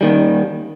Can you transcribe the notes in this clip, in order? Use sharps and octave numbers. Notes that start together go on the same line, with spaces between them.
D#2 D#3 G3